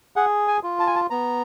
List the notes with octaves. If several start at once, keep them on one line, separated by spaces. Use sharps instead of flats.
G#4 F#5
G#5
F4
A5
G#5
A5
B3 A#5